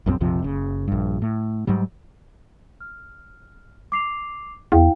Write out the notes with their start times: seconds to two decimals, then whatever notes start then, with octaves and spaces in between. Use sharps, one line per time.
0.06 A#1 F#2 D#3 C4
0.21 A#1 F2 C3 F3
0.42 F#1 C#3
0.88 A#1 G2
1.22 A2
1.67 G#2 F#3 G3
2.81 F6
3.92 D6 C7 F7
4.72 E2 E4 F5 G5